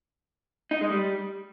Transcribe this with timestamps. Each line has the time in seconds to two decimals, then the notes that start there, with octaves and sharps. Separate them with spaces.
0.71 D#4
0.81 G#3
0.91 G3